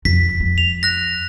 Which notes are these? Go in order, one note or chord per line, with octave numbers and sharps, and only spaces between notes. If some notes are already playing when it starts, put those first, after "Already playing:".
F2 D3 B6
F2
F7
F#6 A#6